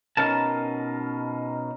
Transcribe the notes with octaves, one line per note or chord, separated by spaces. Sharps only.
B2 C#4 D#4 A#4 A5